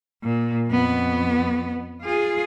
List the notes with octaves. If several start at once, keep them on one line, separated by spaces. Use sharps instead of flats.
A#2
F2 B3
F4 G#4